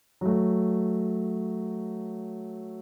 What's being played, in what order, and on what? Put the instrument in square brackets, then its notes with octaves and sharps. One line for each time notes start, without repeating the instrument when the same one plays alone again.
[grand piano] F#3 A3